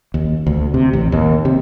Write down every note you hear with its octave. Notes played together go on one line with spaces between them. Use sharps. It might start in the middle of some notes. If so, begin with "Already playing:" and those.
D#2
D2
C3
A1
D#2
C3